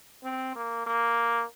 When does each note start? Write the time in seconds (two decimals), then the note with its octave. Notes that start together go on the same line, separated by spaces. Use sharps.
0.24 C4
0.56 A#3
0.87 A#3